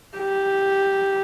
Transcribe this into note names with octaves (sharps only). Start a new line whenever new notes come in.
G4